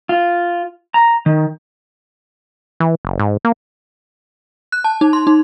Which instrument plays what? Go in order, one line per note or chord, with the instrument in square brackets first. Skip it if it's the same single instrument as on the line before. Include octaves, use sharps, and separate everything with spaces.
[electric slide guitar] F4
A#5
D#3
[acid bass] E3
F#1
G#2
A#3
[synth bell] F#6
A5
D#4
C6
D#4